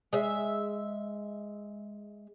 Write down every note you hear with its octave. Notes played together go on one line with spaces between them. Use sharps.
G#3 E5